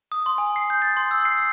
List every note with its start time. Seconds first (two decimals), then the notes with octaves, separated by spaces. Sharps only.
0.12 D#6
0.26 C6
0.38 G#5
0.56 C7
0.70 G6
0.82 A6
0.97 C6
1.11 E6
1.25 C7
1.38 C7